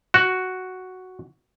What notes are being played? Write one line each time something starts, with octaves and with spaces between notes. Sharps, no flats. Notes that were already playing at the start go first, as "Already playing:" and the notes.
F#4